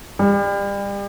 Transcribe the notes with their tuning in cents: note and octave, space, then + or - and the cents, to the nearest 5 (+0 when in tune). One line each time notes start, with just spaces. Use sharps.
G3 +35